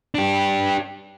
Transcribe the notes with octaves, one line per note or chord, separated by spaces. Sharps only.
D4 G4